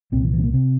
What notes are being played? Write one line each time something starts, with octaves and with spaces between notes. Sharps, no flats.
C2 A#2 C4
E3
E3
C4
A#3
C3 C4